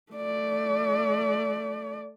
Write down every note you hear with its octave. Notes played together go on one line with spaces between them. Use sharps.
A3 D5